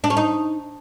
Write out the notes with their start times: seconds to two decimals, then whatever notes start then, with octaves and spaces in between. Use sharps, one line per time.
0.04 D4
0.10 C#4
0.17 D#4